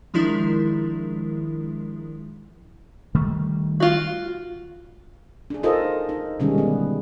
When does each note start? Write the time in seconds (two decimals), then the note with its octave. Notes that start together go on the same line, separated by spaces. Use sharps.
0.14 D#3 F3 G#3 D4 E4 A#4
3.15 D#3 G3 A3
3.80 F4 F#4
5.50 D4 G#4
5.63 D#4 F4 A4 A#4 C5 D#5
6.09 D#4
6.39 B2 D3 D#3 G3 G#3 C#4
6.58 B3